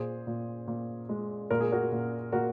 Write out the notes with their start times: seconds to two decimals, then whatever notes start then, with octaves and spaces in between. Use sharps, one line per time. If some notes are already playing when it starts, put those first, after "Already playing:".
Already playing: A#2 G#4 C5
0.27 A#2
0.68 A#2
1.09 G#3
1.51 A#2 A#4
1.61 G#4
1.72 F#4 A#4
1.92 A#2
2.32 A#2 F#4 A#4